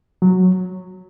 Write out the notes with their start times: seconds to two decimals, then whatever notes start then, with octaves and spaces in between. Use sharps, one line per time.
0.22 F#3